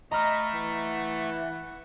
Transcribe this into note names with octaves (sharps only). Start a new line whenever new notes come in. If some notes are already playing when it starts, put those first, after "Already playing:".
A3 D#5 A#5 B5 F6
E3 F#5